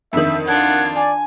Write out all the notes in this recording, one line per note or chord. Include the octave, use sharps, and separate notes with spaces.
F2 D3 D#3 E5
D4 F4 F#5 G#6
D5 G#5